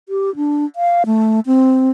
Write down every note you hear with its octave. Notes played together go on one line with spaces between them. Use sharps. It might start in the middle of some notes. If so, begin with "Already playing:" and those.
G4
D4
F5
A3
C4